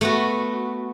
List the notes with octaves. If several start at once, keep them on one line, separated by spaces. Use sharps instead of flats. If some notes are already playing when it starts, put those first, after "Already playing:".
A3 B3 F#4